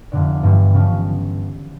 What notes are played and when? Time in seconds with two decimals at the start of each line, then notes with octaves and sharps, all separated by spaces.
0.12 F1 F2 D3 D5
0.43 G1 G2 E3 G3
0.74 C#3 F3